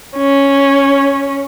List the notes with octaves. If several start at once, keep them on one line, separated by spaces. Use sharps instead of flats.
C#4